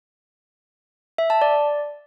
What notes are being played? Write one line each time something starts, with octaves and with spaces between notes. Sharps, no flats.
E5
A5
D5